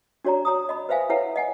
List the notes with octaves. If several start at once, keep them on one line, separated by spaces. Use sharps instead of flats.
D4 F#4 C#5 D5 A#5
C#5 A#5 D#6
D#5 B5
B4 C5 E5 F5 G#5
E4 A4 B4 C#5 E5 F#5
D#5 F#5 G#5